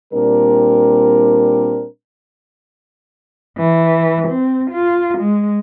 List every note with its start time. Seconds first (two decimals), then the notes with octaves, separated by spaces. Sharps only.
0.13 A#2 G3 C4 D4 A#4
3.58 E3
4.29 C4
4.71 F4
5.19 G#3